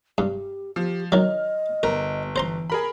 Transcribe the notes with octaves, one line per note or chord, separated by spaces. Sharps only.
G2 G4
F3 G4
D#3 F#3 D#5 F6
G1 A#4
E3 C5 A#5 C6
G#4 A#4 B5